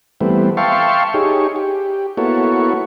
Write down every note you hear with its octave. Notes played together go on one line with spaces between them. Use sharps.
E3 G3 A3 B3 C4
E5 F5 G5 A5 C6 C#6
D#4 G4 G#4 C#5
G4
A#3 B3 E4 F#4 A4 C#5